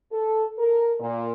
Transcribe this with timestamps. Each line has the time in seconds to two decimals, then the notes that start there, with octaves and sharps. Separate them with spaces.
0.12 A4
0.58 A#4
1.00 A#2